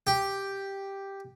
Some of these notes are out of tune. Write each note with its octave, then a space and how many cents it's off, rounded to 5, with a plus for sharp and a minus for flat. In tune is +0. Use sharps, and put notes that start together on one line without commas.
G4 +0